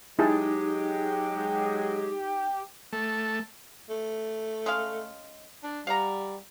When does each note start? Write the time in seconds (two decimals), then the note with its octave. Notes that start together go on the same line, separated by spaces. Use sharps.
0.19 F#3 G#3 D#4 E4 G4 G#4 A5
2.93 A3
3.90 A3
4.66 G#3 C#4 F5
5.63 D4
5.87 G3 F5 F#5 A#5